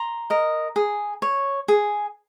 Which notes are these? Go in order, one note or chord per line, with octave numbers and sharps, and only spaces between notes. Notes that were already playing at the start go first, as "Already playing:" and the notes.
Already playing: A#5 C6
A#4 D#5
G#4
C#5
G#4